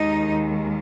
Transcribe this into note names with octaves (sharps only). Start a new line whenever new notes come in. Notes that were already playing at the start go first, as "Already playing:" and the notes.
Already playing: D#2 D#3 G#3 D#4